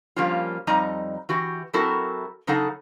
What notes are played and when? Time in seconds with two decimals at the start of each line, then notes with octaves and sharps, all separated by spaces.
0.16 F3 G3 A#3 C#4 F4
0.67 F2 G3 D#4 D#5 A#5
1.29 E3 F#4 G4
1.73 F#3 C4 E4 F#4 A4 A#4
2.47 C#3 F#3 D#4 G#4 A4 F#5